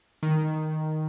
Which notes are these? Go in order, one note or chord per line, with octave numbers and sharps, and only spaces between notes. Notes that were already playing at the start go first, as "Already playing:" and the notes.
D#3